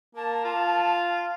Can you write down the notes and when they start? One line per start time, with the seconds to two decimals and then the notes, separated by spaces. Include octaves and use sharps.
0.15 A#3 A5
0.44 F4